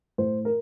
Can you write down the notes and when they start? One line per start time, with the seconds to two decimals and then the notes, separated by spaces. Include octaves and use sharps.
0.18 A2 C5
0.45 A#4